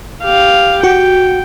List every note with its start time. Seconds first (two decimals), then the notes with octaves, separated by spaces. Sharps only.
0.24 G4 F5
0.84 F#4 G5